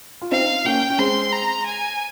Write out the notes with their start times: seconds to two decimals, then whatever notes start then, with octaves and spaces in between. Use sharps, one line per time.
0.22 F4
0.31 C4 D#4 F5
0.65 A#3 C#4 G5
0.90 C#4
0.98 G#3 C4 C6
1.32 A#5
1.66 G#5